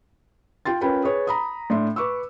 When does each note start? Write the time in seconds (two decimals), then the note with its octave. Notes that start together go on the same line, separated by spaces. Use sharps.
0.65 F4 G5 C6 A6
0.81 C#4 F4 A#4 B4 G5 B5
1.03 G#4 B4 C#5 D#6
1.27 A#5 B5 D#6
1.70 A2 D4 E5 C6
1.96 B4 C#6 D6 E6